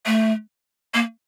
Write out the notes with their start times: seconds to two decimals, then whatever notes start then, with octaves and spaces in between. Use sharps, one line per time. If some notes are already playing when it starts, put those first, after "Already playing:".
0.06 A3
0.94 A#3